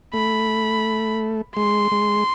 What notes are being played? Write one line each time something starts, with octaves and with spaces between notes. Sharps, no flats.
A3 B5
G#3 C6
G#3